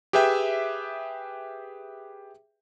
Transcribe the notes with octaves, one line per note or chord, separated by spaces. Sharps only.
G4 G#4 B4 E5 G5